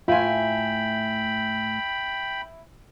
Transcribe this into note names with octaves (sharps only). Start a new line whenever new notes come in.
A2 A3 E4 F4 G5 G#5 B5